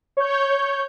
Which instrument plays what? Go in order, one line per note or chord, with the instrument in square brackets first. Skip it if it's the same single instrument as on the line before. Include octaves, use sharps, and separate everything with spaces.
[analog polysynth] C#5 G6